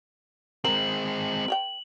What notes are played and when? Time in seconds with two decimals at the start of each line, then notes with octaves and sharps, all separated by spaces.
0.65 G#3 C4 A#4 F#7
1.48 A#4 C#5 G5